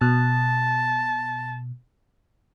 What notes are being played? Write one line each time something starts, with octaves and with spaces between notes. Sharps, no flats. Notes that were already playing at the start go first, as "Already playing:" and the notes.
B2 A5